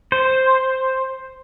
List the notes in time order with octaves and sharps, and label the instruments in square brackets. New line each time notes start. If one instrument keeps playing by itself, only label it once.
[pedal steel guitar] C5